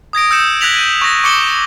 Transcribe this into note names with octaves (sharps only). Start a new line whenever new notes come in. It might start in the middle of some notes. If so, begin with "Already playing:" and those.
D#6 G#6 A#6 D7
E6 G6 C#7 E7
F#6 G#6 A#6 B6 F7 F#7
G6 D#7
C#6 A#6
C#6 D6 C#7 E7 G7